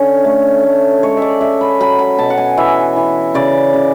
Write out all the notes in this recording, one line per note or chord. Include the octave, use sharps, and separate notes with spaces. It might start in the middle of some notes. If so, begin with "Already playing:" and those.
Already playing: D3 C#4
A3
A3
G#3 C#5
D5 E5
C#4 E5
B5
F#3 B5
B5
B2 A5
F#5
G#5
E3 E5
E3
C#3 D5
C#3